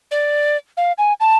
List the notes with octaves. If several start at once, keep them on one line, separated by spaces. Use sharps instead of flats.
D5
F5
G#5
A5